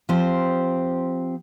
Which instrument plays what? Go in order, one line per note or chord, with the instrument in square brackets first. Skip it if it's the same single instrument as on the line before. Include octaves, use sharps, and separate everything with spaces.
[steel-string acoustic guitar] F3 C4 G4 C5